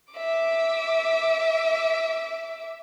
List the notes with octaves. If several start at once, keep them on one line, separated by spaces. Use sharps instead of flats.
E5 D6